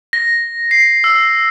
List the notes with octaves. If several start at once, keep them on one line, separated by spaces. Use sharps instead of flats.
A#6
C7
E6